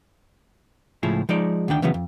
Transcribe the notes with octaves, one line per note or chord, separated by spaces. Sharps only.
C#2 A2 F3 E4 G#4
F3 G#3 D#4 D5
D2 D#3 D4 G5
C#2 C#3 E3 F#3 B3
F2